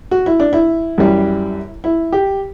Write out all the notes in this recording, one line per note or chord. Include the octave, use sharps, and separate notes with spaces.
F#4
E4
D4
E4
F#2 E3 G3
E4
G4